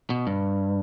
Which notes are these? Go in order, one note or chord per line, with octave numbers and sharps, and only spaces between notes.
B2
G2